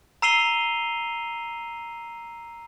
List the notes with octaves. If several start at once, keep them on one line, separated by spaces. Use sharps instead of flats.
A#5 E6 C7 D#7 F7 G7